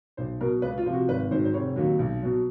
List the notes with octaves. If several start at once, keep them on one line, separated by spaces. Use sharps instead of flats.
B1 C5
B2 F#3 A#4
C#2 B4
F4
C3 F3
F#4
G#1 B4
G#2 D#3 F#3 C5
C5
F1 C#5
D#2 D#3 F#3
B1
B2 F#3